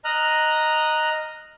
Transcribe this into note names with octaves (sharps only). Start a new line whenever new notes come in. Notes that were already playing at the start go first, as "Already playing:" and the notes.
D#5 A#5 F6 F#6